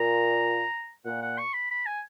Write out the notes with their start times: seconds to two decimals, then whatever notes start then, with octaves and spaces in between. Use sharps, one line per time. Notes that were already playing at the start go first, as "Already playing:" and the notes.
Already playing: A#2 A#5
1.05 A#2 F#5
1.22 F#5
1.38 C#6
1.54 B5
1.71 B5
1.86 G#5